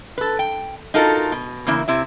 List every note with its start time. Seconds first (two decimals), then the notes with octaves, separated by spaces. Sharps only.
0.18 A4 B4
0.39 G5
0.94 D#4 F4 F#4 A4 A#4
1.32 B2
1.67 E2 C#3 A#3 E4
1.88 C3 E4 E5